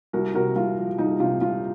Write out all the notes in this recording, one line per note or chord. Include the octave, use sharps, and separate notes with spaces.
C2 F#4 A#4
C3 F#4 A#4
C2 F4
F3
C2 D#4
C3 F4
C2 F4